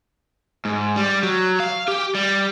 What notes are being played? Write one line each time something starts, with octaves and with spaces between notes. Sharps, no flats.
G#2
G3
F#3
F5
G4
G3